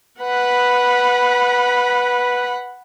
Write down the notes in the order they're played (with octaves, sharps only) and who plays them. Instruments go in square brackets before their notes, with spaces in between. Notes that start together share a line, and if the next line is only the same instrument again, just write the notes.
[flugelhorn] B4 [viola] F#5 B5